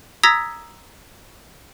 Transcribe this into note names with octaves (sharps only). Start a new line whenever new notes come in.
A#5 D#6 E6 G#6 A#6 B6